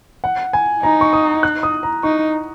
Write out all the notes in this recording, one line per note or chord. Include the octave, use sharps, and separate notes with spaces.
F#5
G#5
D#4 A#5
C#6
D#6
F#6
D#6
A#5
D#4 C#6